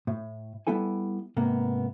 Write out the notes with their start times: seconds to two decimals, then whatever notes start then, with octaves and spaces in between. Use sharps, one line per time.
0.07 A2
0.67 G3 B3 E4 A4 G#5
1.36 G#2 C3 A#3 B3